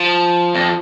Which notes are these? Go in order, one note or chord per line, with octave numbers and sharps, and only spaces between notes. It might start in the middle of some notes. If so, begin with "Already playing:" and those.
Already playing: F3
F2